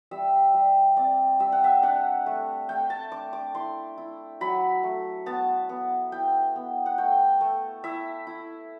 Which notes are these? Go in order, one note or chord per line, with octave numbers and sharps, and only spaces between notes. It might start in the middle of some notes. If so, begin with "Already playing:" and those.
G3 E5
G3
C4 D5
G3 E5
F#5
E5
D4 F#5
A3
A3 G5
A5
D4 D6
D6
E4 C6
E4
F#3 B5
A3
B3 A5
B3
E4 G5
B3
F#5
A3 G5
A3
E4 E5
E4